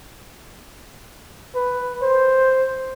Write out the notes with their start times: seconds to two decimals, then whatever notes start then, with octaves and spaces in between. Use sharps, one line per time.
1.55 B4
2.02 C5